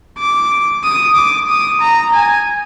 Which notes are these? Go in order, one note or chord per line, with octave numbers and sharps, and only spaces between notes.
D6
D#6
D6
D#6
A#5
G#5